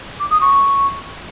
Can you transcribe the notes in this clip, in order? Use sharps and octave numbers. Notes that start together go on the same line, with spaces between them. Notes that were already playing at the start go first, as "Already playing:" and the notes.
D6
D#6
C#6